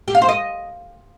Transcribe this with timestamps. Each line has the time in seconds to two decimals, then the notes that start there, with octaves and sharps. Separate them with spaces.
0.08 G4
0.15 F5
0.22 C5
0.29 D#5